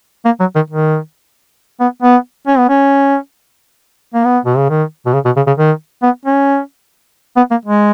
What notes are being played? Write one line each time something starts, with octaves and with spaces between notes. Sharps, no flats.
A#3
F#3
D#3
D#3
B3
B3
C#4
B3
C#4
A#3
B3
B2
C#3
D#3
B2
C#3
B2
C#3
C#3
D#3
B3
C#4
B3
A#3
G#3